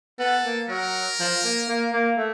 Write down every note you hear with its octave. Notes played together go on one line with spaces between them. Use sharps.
B3 A4
A#3
F#3 A#4
F3
A#3
A#3
A#3
A3